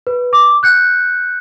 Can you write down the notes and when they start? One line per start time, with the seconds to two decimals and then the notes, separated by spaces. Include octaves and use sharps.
0.07 B4
0.33 D6
0.63 F#6 G6 C#7